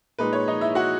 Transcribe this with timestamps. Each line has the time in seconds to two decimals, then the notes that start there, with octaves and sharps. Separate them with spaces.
0.19 A#2 G#3 D#4 B4
0.33 C#5
0.48 D#4 D#5
0.61 E4 E5
0.75 F#4 F#5